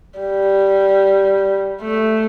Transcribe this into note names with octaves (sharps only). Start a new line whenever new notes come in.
G3
A3